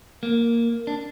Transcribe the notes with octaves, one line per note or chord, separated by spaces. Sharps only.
A#3
D4